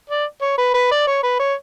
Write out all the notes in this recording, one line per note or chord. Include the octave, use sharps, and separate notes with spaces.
D5
C#5
B4
B4
D5
C#5
B4
C#5